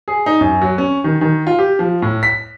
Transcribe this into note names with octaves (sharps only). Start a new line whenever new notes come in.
G#4
D#4
F#2
F#3
C#4
D#3
D#3
F4
G4
F3
A2
B6